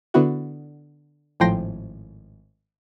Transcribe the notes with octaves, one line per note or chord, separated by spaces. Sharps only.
D3 B3 E4 F#4
G#1 A2 F3 G5 C6 A#6